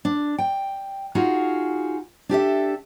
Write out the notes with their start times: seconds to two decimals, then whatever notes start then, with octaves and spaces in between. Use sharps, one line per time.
0.05 D4
0.38 G5
1.15 D#4 F4 F#4 G#4
2.29 D4 G4 A4 E5